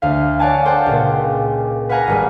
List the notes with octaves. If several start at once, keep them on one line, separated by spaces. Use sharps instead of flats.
D2 F5
C#5 D5 F5 F#5 G#5 A5
A4 C5 D5 F#5 G5
C#2 A#2
B4 F5 F#5 G#5 A#5
G#1 G3 G#3